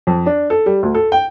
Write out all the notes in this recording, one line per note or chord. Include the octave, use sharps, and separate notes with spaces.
F2
D4
A4
G3
D2
A4
G5